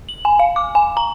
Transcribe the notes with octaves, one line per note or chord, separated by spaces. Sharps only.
F#7
G#5
F5
D6
G#5
A#5